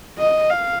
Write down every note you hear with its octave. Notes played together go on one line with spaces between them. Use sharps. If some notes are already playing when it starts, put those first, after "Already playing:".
D#5
F5